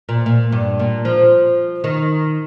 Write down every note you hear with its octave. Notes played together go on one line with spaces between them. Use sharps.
A#2
A#2
G2
A#2
F3
D#3